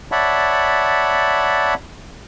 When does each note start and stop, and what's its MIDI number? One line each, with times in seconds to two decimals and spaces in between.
0.12 1.74 73
0.12 1.74 74
0.12 1.74 76
0.12 1.74 78
0.12 1.74 81
0.12 1.74 83